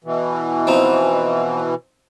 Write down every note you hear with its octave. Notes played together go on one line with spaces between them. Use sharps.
B2 E3
F3 C4 D#4